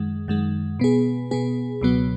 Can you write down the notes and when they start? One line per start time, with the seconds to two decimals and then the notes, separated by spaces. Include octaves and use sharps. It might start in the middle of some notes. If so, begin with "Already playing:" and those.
Already playing: F#2 D#3 G#3
0.28 F#2 D#3 G#3
0.80 B2 B3 G#4
1.31 B2 B3 G#4
1.81 C#2 B2 F#3 B3